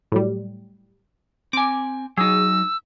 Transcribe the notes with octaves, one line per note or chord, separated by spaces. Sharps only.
A2 F#3 G3
C4 G#5 D6
F#3 D#4 G#4 E6